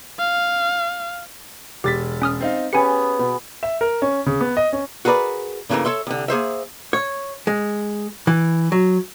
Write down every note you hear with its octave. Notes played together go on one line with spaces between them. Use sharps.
F5
E1 G4 A6 B6
C#4 D#6 F6
C4 D#4 F5
B3 C#4 G4 G#4 B4 G#5 C#7
B2 B3
E5
A#4
C#4
C#3
B3
D#5
C#4
F#4 G#4 A#4 B4 D5
G2 C#3 E3 G3 A3 A#3
A4 C#5 E5 C6
C2 D3
A#3 G#4 C5 E5
C#5
G#3
E3
F#3